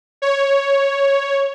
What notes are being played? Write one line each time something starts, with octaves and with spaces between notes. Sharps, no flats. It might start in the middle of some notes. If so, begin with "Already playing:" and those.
C#5